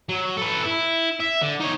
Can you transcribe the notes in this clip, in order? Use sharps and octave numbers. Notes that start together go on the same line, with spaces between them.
F#3
A4 B4
E4
E5
D3
D#4 C#5